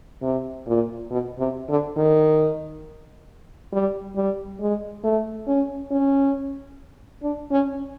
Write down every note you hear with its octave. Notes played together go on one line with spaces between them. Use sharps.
C3
A#2
B2
C3
D3
D#3
G3
G3
G#3
A3
C#4
C#4
D4
C#4